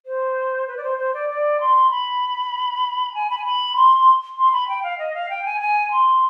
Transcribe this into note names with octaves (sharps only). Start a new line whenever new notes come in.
C5
B4
D5
C5
C5
D5
D5
C6
B5
G#5
B5
G#5
B5
C6
C6
B5
G5
F5
D#5
F5
G5
G#5
G#5
C6